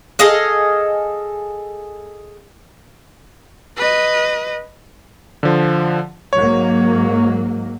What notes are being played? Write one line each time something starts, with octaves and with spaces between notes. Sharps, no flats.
G#4 A4 D#5 F5
B4 D#5
D3 F3
G#2 F#3 A#3 C#5